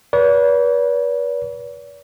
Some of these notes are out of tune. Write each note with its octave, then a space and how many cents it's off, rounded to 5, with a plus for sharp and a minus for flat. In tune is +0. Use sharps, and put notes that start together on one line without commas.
B4 -30 D5 -45